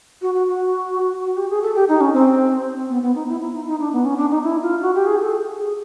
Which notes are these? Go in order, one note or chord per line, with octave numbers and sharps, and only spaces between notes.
F#4
F#4
F#4
F#4
G4
G#4
A4
G4
D#4
C#4
C4
B3
B3
D#4
E4
E4
D#4
D#4
D4
B3
C#4
D4
D#4
E4
F4
F#4
G4
G#4
A4
G#4